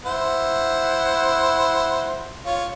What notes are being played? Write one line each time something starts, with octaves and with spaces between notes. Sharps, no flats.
E4 C5 F#5
F4 C#5